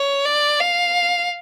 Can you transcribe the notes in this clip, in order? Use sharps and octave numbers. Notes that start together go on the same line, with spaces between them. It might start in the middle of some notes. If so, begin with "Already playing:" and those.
Already playing: C#5
D5
F5